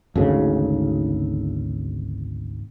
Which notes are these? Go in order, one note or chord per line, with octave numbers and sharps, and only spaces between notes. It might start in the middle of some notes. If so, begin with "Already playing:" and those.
G#1 D2 C#3